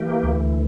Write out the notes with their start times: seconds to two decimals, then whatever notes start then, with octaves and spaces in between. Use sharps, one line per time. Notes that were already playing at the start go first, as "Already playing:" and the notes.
Already playing: E3 A#3 G4
0.23 D2